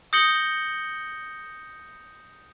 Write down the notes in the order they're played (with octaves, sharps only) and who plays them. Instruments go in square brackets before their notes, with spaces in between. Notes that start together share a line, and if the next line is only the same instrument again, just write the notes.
[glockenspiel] D#6 G6 A#6 C#7 F#7 G7